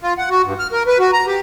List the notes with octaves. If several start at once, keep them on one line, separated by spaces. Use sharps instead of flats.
F4
F#5
F#4
G2
F6
A#4
B4
F#4
A#5
G4